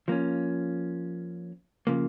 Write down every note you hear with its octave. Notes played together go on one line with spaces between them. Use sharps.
F3 A#3 C#4
C#3 F3 A#3